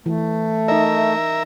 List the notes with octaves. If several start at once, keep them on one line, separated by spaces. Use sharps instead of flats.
E3 A3
D#4 A#4 D#5 E5